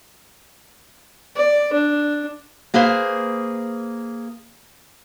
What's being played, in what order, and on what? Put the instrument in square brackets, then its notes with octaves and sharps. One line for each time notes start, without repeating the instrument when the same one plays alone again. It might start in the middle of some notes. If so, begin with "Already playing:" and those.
[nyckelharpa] D5
D4
[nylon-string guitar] A#3 G#4 B4 C5 F5